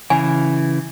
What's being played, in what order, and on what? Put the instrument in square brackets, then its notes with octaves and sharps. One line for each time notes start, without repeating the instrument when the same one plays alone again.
[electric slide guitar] C#3 E3 [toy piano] G#5